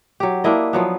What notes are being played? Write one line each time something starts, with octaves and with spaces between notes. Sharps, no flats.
F#3 G4
A#3 D4 E4 D#5
F3 F#3 B3